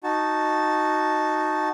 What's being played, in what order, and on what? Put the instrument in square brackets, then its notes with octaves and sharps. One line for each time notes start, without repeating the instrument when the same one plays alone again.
[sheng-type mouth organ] D#4 F#4 A5